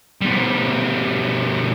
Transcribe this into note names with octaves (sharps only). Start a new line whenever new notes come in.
B2 G3